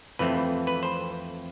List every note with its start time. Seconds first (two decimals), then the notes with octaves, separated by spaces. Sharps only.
0.19 F2 E3 A3 C4 B4
0.67 B4
0.83 C5